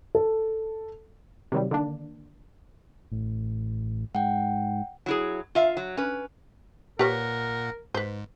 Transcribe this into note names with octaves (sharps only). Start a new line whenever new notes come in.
A4
C3 D#3 F#3 G3
D3 D#3 A#3 D4
A1
G#2 F#5 G5
F#3 E4 G#4
F4 E5 F5
F#3
C#4 B4
A#2 G4 A#4 B4 C#5 F#5
G#2 B4 C5